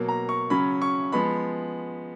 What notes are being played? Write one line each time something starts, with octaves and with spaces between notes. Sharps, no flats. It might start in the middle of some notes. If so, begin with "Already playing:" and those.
Already playing: B2 F#3 A#3
A#5
C#6
C#3 F#3 C#4 B5
C#6
F3 G#3 B3 B5